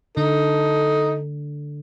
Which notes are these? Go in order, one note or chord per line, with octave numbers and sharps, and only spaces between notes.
D3 D#4 A4